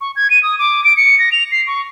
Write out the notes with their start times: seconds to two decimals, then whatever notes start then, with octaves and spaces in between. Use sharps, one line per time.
0.01 C#6
0.16 G#6
0.30 D#7
0.43 D#6
0.59 D6
0.84 D7
0.97 C#7
1.19 A#6
1.32 F7
1.51 C7
1.67 C#6